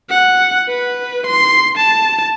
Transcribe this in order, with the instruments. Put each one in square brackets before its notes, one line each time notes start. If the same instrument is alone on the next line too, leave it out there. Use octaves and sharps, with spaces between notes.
[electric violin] F#5
B4
C6
A5